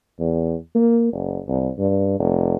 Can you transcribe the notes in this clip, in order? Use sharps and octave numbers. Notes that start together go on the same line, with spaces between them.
E2
A#3
F#1
C2
G2
F1